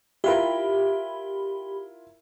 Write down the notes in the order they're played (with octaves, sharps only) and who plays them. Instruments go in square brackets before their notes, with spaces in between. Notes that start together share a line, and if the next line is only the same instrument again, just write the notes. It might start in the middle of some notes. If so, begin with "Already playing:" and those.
[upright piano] E4 F4 A#4 [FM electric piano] G4 B5